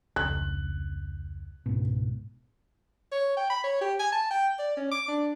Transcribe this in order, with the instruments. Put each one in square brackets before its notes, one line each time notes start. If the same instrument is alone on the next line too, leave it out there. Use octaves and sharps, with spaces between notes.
[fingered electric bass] F1 C#2 [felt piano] F#6
[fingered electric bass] C#2 G#2 B2
[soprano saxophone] C#5
G5
B5
C#5
G4
G#5
A5
G5
D5
C#4
D6
D4